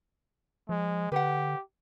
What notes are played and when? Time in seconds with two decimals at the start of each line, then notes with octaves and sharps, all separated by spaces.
0.69 F3 G#3
1.12 D3 G4 B4 F#5